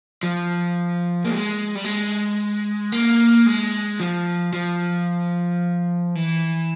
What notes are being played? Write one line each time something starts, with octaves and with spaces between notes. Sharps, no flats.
F3
A#3
G#3
G3
G#3
A#3
G#3
F3
F3
E3